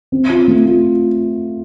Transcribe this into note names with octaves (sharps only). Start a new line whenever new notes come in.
C4
F4
A3
F4